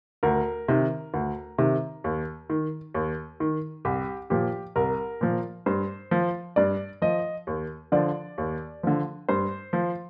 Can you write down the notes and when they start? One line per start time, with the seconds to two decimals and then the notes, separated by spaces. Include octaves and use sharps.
0.23 D2 A#4
0.68 C3 D#3
1.14 D2
1.58 C3 D#3
2.04 D#2
2.50 D#3
2.94 D#2
3.40 D#3
3.85 C2 G4
4.30 A#2 F3 G4
4.76 C2 A#4
5.21 A#2 F3
5.66 G2 C5
6.11 F3
6.56 G2 D5
7.02 F3 D#5
7.47 D#2
7.92 D3 F3 D5
8.38 D#2
8.83 D3 F3
9.29 G2 C5
9.73 F3